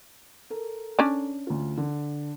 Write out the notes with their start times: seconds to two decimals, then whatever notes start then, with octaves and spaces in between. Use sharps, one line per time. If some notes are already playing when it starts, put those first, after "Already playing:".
0.50 A4 A#4
0.99 C#4 D4
1.47 D2 F4
1.78 D3